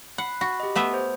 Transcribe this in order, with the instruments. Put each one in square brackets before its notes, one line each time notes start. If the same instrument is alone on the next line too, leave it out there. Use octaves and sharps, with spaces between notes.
[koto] F#5 [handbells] B5 F#6 C7
[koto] F#4 [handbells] B5
[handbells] G4 D#5
[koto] A3 B3 E5
[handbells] C5